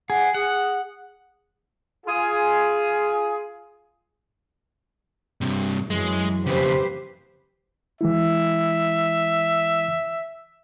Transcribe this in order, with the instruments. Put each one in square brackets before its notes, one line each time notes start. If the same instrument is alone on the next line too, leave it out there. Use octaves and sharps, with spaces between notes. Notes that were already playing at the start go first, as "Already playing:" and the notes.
[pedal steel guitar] G#4 [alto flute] F#5
[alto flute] G#4 [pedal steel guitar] F#5
[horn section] F4 G#4
[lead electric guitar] G2 C3
[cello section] F#2 E3 F#3 [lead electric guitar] G#3
[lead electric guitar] F2 C#3 [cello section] G4 B4 C5
[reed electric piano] E3 G#3 E4 [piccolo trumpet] E5